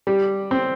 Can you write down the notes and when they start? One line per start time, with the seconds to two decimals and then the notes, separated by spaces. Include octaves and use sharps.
0.07 G3
0.51 C4